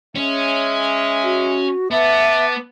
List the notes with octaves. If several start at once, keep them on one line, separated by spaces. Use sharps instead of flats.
G#3 C#4 E5
F#4
B3 B4 E5 A5 D6